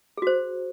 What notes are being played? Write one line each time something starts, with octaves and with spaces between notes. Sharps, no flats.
F#4 G#4 C5